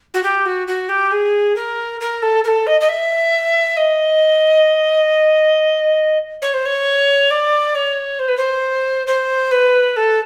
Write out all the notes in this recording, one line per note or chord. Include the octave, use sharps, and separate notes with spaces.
F#4
G4
F#4
F#4
G4
G#4
A#4
A#4
A4
A#4
A4
D#5
D#5
E5
D#5
C#5
C5
C#5
D5
C#5
C5
B4
C5
C5
B4
A4